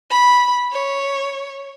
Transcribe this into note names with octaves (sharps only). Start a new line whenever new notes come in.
B5
C#5